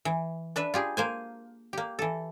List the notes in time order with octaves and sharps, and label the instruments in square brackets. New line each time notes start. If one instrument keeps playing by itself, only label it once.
[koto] E3
D4 B4 E5
F4 G4 G#4
A#3 C5 G#5
A#3 G4
E3 A4